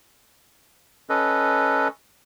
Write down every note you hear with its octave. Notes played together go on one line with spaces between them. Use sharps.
C#4 A4 B4 D#5